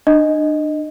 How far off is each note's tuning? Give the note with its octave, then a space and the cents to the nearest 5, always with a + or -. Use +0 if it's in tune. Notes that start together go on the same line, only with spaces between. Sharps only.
D4 +35 D#5 +0